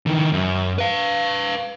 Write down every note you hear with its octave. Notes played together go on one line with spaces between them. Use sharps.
D#3 E3
F#2
B4 F5